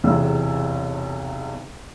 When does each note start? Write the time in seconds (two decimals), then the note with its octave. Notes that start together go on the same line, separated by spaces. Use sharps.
0.04 B1 E2 C3 G#4 E6